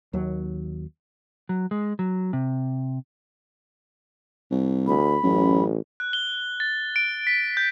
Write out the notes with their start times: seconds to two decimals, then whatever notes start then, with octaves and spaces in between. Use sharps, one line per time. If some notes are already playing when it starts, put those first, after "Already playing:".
0.13 D#2 F#3
1.49 F#3
1.71 G#3
1.99 F#3
2.33 C3
4.51 C2
4.87 D2 B5
5.24 A1 F#2
6.00 F#6
6.13 G7
6.60 A6
6.96 D7
7.27 B6
7.57 G6